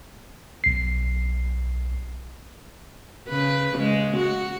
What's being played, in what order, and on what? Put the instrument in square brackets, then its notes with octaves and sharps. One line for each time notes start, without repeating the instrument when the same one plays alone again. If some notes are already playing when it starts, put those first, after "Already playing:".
[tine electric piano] B1 C7
[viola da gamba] C#3 B4
C#3 G#3
F#4